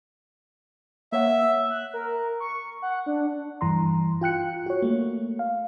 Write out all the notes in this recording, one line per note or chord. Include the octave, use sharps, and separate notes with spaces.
A#3 C#5 E5 F#5
F#6
A#4
C#6
F#5
D4
G2 E3 A#5 C6
F4 G5 F#6 C#7
F#4 C#5
A3 A#3
F5